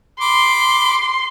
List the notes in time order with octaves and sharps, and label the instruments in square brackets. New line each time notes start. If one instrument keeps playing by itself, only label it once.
[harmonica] B5 D6 [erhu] C6